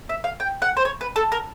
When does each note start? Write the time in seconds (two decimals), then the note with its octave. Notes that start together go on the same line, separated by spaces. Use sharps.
0.09 E5
0.24 F5
0.40 G5
0.62 F#5
0.77 C5
0.85 C#5
1.01 B4
1.16 A4
1.32 A#4